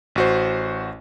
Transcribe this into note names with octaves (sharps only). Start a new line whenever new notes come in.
A1 F#4 C5